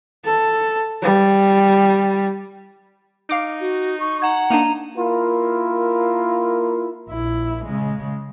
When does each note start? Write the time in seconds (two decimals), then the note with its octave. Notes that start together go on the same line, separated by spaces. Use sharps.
0.25 A4
1.02 G3
3.30 D#4 F5 D6 D7
3.61 F#4
4.00 C#6
4.22 F#5 A#5 G#6
4.50 A#3 D4 D#4 A#5 D#7 F7
4.97 A#3 E4 F4 A#4
7.09 A#1 E4
7.66 C#3 G#3